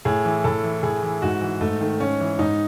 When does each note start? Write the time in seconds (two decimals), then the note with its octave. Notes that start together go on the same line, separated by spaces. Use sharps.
0.05 A2 G#4
0.25 E3
0.44 A2 A4
0.64 E3
0.83 A2 G#4
1.03 E3
1.22 G#2 F#4
1.41 E3
1.61 G#2 A3
1.81 D#3 A3
2.00 G#2 C#4
2.20 E3
2.39 G#2 D#4